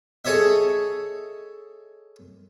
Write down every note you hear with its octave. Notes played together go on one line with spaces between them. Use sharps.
G#4 A4 C#5 D#5 E5